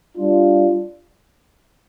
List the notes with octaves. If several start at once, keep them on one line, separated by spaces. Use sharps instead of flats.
G3 D4 F4